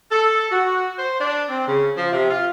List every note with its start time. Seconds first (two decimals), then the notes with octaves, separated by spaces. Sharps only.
0.11 A4
0.51 F#4
0.99 C5
1.21 D4
1.50 C4
1.68 C#3
1.97 F3
2.12 C3
2.31 F4